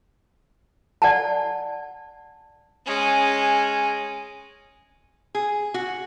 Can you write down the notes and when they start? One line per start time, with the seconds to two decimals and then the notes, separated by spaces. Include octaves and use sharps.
1.02 D5 F#5 G#5 A5
2.86 G#3 C#4
5.35 G#4
5.74 F#4